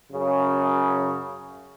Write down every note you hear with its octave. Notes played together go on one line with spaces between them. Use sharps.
F#2 C#3